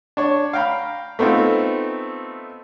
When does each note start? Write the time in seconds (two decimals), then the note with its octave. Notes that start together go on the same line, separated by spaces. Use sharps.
0.17 D4 C#5
0.53 F5 G5 A#5 B5
1.19 A3 B3 C4 D#4 F4